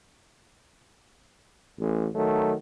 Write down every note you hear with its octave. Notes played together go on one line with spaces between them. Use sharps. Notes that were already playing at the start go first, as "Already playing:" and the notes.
A1
D#3 F#3 A3